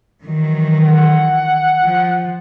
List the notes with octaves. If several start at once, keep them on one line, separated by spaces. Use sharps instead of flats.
D#3 E3 F#3
F#5
F3